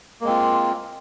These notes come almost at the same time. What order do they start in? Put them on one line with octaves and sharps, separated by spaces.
A#3 G#3 C4 F4